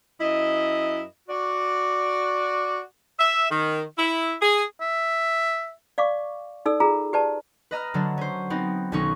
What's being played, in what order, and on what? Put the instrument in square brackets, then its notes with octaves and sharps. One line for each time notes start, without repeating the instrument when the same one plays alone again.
[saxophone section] F#2 E4 D#5
F#4 D5
[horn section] E5
D#3
E4
G#4
[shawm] E5
[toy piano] D5 F5 C#6 D6
D#4 A4 D5 E6
F4 G#4 A#5
G4 B4 D5 A5
[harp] B4 D#5 A#5 F6
D3 F#3 D4
C#4 C5
B3 C4 D#4
B1 D#3 C#4 D#4 C#6